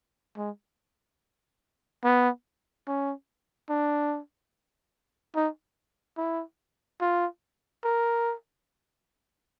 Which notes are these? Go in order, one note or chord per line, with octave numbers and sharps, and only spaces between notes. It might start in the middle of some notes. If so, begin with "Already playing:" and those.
G#3
B3
C#4
D4
D#4
E4
F4
A#4